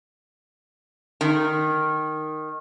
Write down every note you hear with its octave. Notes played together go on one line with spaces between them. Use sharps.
D#3